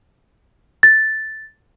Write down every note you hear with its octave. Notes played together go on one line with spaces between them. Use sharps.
A6